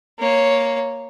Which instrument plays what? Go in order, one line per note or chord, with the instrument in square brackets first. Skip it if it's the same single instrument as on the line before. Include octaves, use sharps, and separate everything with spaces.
[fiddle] A#3 C#5